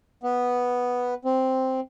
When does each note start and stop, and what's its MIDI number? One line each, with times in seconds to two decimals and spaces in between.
0.23 1.14 59
1.25 1.80 60